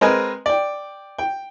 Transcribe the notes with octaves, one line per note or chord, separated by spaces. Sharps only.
G#3 C4 A#4 B4 D#5 G#5
D5 G5
G5